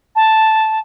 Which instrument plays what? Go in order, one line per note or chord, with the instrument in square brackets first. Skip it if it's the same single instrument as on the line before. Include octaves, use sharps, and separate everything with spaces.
[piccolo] A5